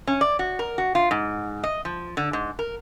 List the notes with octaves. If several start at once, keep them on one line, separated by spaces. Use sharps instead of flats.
C#4
D5
F#4
A#4
F#4
F4
G#2
D#5
F3
D3
G#2
A#4